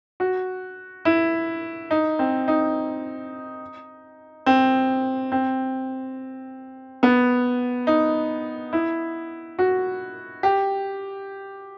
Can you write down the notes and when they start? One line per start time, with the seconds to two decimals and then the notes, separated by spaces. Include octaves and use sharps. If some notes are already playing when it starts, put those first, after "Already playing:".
0.20 F#4
1.05 E4
1.91 D#4
2.19 C4
2.48 D#4
4.46 C4
5.32 C4
7.03 B3
7.87 D#4
8.73 E4
9.59 F#4
10.43 G4